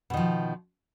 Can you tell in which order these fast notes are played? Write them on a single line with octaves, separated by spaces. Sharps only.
B2 D#3 F3